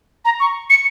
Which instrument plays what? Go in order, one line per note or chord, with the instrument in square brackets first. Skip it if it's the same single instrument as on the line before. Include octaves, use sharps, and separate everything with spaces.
[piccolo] A#5
C#6
C#7